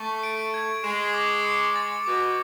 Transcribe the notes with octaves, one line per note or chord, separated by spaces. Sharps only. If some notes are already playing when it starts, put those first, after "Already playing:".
Already playing: A3 C#6
D7
G#6
G#3 E7
D6
C#7
A6
B2 D6